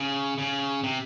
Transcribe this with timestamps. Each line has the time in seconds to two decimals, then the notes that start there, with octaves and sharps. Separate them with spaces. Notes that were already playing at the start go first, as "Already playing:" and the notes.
Already playing: C#3
0.38 C#3
0.84 C3